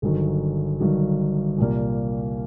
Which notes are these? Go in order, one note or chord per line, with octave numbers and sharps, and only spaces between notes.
G1 G2 D#3 F#3
G1 G2 D#3 F#3
C2 A#2 G3 A#3